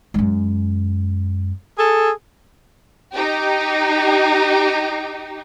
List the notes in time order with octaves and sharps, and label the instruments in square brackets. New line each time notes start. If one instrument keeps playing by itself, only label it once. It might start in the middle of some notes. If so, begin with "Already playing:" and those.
[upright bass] F#2 G#3
[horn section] G#4 A4
[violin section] D#4 G4